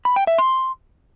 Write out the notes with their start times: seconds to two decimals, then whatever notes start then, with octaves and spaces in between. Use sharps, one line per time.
0.05 B5
0.16 G5
0.27 E5
0.38 C6